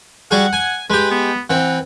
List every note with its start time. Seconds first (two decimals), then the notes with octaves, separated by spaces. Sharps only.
0.31 G3 F#4 G#4 F#5
0.53 G#5
0.90 G#3 G4 B4
1.11 B3
1.50 E3 C4 F#5